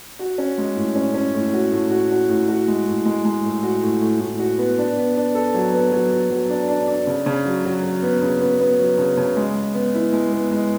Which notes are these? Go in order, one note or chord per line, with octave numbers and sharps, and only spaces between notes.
F#4
C#4
G#3
A2
C#4
C#4
A2
F#4
A2
F#4
F#4
A2
F#4
G#3
A2
G#3
G#3
A2
F#4
A2
A2
A2
F#4
B3
D4
B3
D4
A4
F#3
B3
F#3
F#3
F#3
D4
D4
D4
C#3
C#3
F#3
F#3
F#3
B3
C#3
B3
B3
F#3
C#3
C#3
G#3
G#3
B3
E4
G#3
B3
G#3